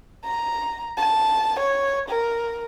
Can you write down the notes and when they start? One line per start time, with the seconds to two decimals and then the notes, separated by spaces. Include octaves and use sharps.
0.24 A#5
0.98 A5
1.60 C#5
2.09 A#4